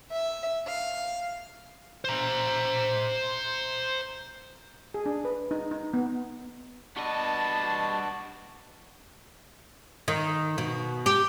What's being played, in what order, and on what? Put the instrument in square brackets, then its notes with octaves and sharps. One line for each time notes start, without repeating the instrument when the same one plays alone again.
[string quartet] E5
F5
[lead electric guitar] C5 A#5
[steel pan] G#4
D4
B4
D#4
D#4
B3
[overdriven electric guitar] G3 D#5 [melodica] D4 [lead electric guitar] F#4 B4 [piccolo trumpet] A5
[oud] D#3
B2
G4